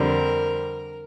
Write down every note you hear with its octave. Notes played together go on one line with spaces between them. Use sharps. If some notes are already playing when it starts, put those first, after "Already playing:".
Already playing: F2 D3 G3 C4 A#4